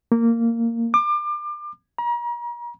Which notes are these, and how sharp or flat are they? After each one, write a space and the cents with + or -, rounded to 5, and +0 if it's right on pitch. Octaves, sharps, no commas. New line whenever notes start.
A#3 -15
D6 +30
A#5 +40